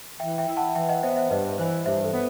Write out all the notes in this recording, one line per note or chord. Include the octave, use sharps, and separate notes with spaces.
E3 E5 G5
E5 G5
E4
F#5 A5
E3 E5 G5
D#5 F#5
B3 C5 E5
C5 E5
G2 B4 D#5
E3 C5
G2 C5 E5
A4
B3